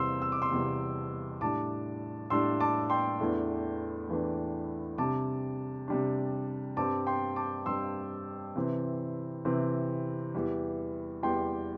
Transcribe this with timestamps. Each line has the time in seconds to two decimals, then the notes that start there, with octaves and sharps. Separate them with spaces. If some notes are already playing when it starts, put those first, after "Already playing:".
Already playing: E2 C3 G3 C4 C6 E6
0.22 E6
0.32 D6
0.42 C6 E6
0.52 E2 C3 G3 C4
1.41 A2 G3 D4 A5 D6
2.30 A2 G3 D4 C6 E6
2.60 A5 D6
2.90 G5 C6
3.20 E2 E3 A3 D4
4.09 E2 E3 A3 D4
4.98 C3 G3 D4 A5 D6
5.88 C3 G3 D4
6.77 G2 G3 C4 A5 D6
7.07 G5 C6
7.36 A5 D6
7.66 G2 G3 C4 C6 E6
8.56 C3 E3 C4
9.45 C3 E3 C4
10.35 E2 E3 G3
11.23 E2 E3 G3 G5 C6